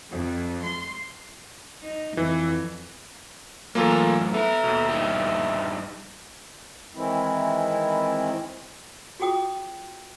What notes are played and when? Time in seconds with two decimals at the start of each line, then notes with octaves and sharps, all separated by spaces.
0.11 F2
0.64 C6
1.82 D#4
2.17 F2 E3
3.75 F#2 A2 E3 A#3 F4 A4 A#5
4.34 B3 A4 E5 A#5
4.64 D#2 B2
4.89 G2 D#4 G4
6.94 D#3 E3 G#3 C4 E4
9.20 F4 F#4 G#4 G5 D#6